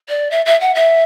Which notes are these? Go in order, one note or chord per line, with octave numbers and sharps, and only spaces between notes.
D5
E5
E5
F#5
E5